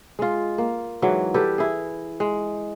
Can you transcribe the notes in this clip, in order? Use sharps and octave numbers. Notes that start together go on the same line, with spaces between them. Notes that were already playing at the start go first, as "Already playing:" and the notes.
G#3 F4
A#3
G#2 E3 F#3
G3 G4 A4 B4
E4 G#4
G#3